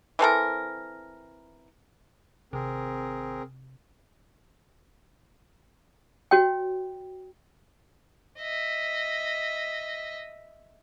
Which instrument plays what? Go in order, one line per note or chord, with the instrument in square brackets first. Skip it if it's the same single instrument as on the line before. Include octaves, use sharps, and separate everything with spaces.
[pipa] E3 C4 A4 A#4
[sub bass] G#1 [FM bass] C3 [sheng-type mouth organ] C4 G#4 A#4
[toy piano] F#4 C#5 G5
[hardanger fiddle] D#5 E5